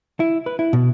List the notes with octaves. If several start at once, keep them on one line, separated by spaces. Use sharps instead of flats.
E4
B4
E4
B2